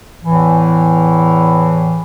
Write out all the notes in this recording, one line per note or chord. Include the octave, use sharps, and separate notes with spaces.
E2 A2 E3